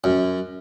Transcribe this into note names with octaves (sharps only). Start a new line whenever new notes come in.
F#2